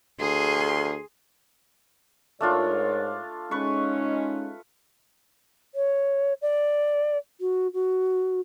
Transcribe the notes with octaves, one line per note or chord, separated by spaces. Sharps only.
D2 G#4 C6
G#2 A3 D4 F4 A#4 C#5
G#3 C#4 D#4 B4 C#6
C#5
D5
F#4
F#4